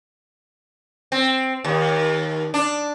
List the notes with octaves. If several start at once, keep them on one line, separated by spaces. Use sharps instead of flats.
C4
D#2
D4